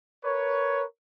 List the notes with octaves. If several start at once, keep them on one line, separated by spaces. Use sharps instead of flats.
A#4 B4 C#5